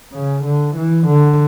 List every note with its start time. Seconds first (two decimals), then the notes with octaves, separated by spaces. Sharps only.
0.13 C#3
0.45 D3
0.77 E3
1.08 D3